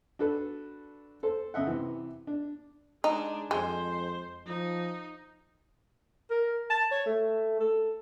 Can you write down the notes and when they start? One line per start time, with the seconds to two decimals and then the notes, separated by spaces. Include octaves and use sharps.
0.19 D4 F#4 A4 B4
1.23 A4 C5
1.54 F#2 C#3 D#5 E5 F#5
1.67 C3 E3
2.27 D4
3.04 G#3 D4 D#4
3.51 F2 G#3 C5
4.46 F3 D#4
6.30 A#4
6.70 A5
6.92 C#5
7.06 A3
7.60 A4